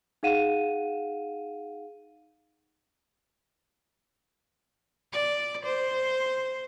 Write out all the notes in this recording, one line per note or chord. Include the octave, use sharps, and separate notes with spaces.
D#4 G#4 F5 F#5 D#7 E7
D5
C5